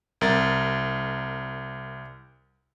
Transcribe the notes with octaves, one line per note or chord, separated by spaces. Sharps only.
C2 A#4 A#5 A6